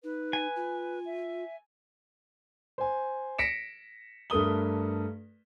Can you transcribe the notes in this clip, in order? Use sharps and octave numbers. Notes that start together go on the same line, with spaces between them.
D#4 B4
G#5
F4
E5
C5 G#5
A#6 B6 C#7 D7 E7
G2 A3 A#4 D#6 G7